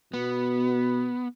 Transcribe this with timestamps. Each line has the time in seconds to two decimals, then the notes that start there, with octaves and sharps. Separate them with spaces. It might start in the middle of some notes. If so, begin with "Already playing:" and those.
0.14 B2 B3